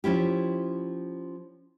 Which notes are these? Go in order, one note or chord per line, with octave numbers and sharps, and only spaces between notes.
F3 C#4 E4 G4